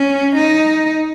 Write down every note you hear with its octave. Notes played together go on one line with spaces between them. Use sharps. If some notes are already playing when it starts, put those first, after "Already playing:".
Already playing: C#4
D#4